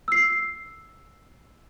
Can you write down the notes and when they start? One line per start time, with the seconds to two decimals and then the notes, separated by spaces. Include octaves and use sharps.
0.08 E6 C7